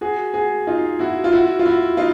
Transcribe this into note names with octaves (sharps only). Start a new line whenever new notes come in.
F#4 G#4
F#4 G#4
D#4 F4
E4 F#4
F4
E4 F#4
F4
E4 F#4
D#4 F4